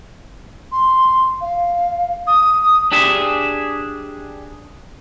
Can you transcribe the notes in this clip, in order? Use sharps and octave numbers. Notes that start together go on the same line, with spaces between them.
C6
F5
D#6
D4 G4 G#4 E5